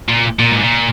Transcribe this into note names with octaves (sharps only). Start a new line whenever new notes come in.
A#2
A#2
G#2
A#2